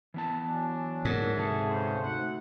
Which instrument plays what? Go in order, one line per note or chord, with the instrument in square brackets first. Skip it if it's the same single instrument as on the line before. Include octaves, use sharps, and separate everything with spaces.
[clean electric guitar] E3 B3 A5
[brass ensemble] F#3 D4 [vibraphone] G#5
[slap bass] G#2 [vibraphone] A#4 F#5
[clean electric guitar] D2 C3 A4 [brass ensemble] G#4 [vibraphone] E5 F#5
[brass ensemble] G2 C#3 C5
[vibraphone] A3 D#4 F#4 [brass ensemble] E5 F#5